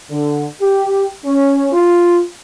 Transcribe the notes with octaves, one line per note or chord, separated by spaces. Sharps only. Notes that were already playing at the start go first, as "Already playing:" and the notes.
D3
G4
C#4
F4